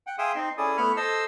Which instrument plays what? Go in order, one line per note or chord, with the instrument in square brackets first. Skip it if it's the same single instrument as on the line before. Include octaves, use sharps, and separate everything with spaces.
[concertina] F#5 G5
G#4 E5 F5 G5 C6 D#6
C4 D#4 C6
C#4 E4 G#4 A4 D5 D#6
A3 B3 E4 B5 C#6 F6
A4 C5 D#5 A5 C6 E6